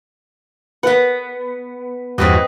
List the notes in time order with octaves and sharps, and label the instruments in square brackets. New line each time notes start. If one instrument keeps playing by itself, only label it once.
[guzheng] B3 F#5 [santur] B4
[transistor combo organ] E2 G2 F#4 [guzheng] C4 B4 D#5